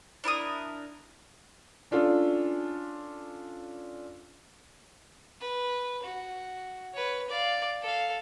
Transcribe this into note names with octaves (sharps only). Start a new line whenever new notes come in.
D4 E4 A#4 D#6
C#4 D4 F4 A4 F5
B4
F#4
B4 C#5
D5 F5
A4 F5